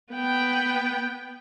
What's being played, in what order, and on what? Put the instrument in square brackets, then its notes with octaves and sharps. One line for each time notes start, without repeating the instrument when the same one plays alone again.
[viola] B3 G5